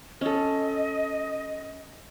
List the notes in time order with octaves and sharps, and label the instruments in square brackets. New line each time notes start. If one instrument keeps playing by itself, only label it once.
[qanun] C#4 A4 [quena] D#5